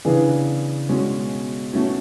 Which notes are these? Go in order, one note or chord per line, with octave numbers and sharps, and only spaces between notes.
C#3 E3 B3 D4 G#4
B2 G#3 C#4
B2 A3 C#4